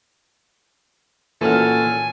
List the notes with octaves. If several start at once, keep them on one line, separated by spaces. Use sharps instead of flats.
A#2 E3 C#4 F#4 A4 G#5 F6